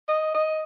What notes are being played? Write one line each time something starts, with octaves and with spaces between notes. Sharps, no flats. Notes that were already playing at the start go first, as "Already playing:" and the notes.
D#5
D#5